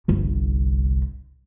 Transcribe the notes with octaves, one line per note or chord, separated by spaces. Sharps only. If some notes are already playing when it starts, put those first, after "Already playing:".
G1 C2